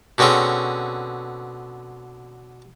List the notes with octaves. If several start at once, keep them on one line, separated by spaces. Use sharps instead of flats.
B2 D3 C4 C#4 G#4